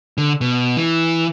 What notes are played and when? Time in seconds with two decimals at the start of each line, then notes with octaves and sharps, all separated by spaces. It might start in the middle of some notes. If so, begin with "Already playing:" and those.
0.18 D3
0.41 B2
0.77 E3